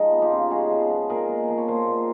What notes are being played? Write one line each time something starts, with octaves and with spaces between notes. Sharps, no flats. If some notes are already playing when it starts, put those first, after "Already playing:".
Already playing: F3 G#3 D#4
B3
F4 G4
C#3
G#3 F#4 G#4
F3
B3
A#2 G#4 A#4
G#3
F3
C#5
A#2 A#4 C5
A#2